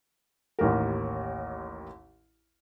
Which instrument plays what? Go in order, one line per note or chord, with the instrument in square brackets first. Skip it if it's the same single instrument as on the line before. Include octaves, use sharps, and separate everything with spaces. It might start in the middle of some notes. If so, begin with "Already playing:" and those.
[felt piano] A1 D#2 A#4